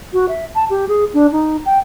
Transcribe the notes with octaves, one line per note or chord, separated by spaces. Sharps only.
F#4
E5
A5
G4
G#4
D4
D#4
G5